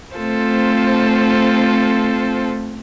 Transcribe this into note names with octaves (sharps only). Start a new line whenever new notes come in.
A3 C4 F4 A4 C5